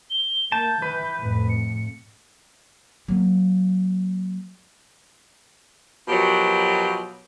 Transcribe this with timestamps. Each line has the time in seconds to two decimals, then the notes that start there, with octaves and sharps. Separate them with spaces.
0.10 G7
0.52 A#3 A5 G6
0.82 E3 B4
1.17 F2 A2
1.49 C#7
3.08 F#3 A#3
6.08 B2 F3 F#3 G4 A#4